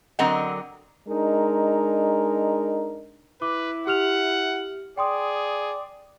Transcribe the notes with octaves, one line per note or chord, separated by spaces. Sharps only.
D3 F#3 C4 A#4 D#5 F#5
G#3 D4 D#4 A#4
E4 B4 D6
G4 F#5 F6 F7
G#4 D5 G5 C6 D#6